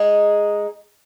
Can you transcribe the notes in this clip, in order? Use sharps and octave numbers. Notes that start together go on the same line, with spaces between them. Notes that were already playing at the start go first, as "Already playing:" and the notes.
Already playing: G#3 D#4 G#4